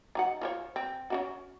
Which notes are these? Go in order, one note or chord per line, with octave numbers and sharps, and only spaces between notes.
F#3 D#4 F#5
F4 C5 C#5
C4
C#4 D4 F#4